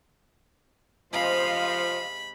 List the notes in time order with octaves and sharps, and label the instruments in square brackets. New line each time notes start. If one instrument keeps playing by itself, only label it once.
[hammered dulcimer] C3 G#3 [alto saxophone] F3 [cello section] C5 D#5 F5 [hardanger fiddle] B5